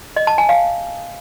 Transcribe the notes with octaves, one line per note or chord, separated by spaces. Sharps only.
D#5
A5
G#5
F5